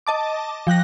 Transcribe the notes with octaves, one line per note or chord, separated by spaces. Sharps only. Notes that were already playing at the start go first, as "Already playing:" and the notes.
D#5 A5 D6
F3 G5 F#6 A#6